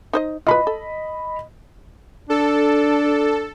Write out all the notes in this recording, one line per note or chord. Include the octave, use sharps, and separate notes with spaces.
D#4 C5 D#5
F4 B4 D#5 B5
A4
D4 A4